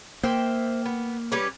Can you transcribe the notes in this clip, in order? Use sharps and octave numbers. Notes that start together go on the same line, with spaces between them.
A#3 C5 E5 G5
B3
G3 C#4 B4